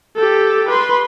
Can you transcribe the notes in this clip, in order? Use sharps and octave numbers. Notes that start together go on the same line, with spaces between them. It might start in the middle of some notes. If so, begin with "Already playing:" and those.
G4 A4
B4 C6